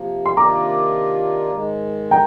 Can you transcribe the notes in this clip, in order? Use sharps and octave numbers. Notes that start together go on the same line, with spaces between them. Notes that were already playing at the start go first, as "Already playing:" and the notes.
Already playing: C3 F3 A#3
C6
C3 D#3 A#3 D4 F4 A#5 D6
G#2 D#3 G#3
G5 A#5